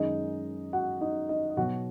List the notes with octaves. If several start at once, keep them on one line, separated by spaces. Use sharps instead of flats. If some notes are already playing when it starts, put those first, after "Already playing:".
Already playing: F#2 D#3 G#3 D#4 D#5
F#4 F#5
D#4 D#5
D#4 D#5
D#5
B2 F#3 F#4 F#5